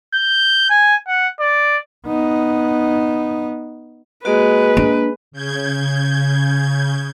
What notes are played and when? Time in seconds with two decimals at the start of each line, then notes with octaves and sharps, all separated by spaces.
0.14 G6
0.70 G#5
1.08 F#5
1.40 D5
2.06 B3 D#4
4.25 G#3 A#3 F#4 B4
4.77 A#3 D4
5.31 C#3 G6 G#6